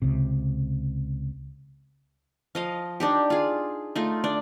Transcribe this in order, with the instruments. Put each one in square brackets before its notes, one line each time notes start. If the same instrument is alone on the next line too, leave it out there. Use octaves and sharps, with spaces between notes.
[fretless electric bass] C#2 C3
[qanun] F3 D#5 F5
D4 D#4 G4
F4 G#4
A3 D#4 F4
D4 D5